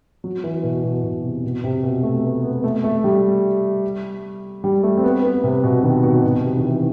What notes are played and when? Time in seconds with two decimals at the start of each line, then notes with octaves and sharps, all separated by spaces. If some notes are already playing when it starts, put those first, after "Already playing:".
0.24 F#3
0.44 E3
0.63 B2
0.84 B2
1.04 B2
1.23 C3
1.44 B2
1.64 C3
1.84 B2
2.03 A3
2.23 B3
2.43 B3
2.64 A3
2.84 A3
3.04 G3
4.64 G3
4.83 A3
4.97 C4
5.04 B3
5.24 B3
5.44 C3
5.64 B2
5.83 D#3
6.03 B2
6.24 B2
6.43 C3
6.57 D#3
6.63 E3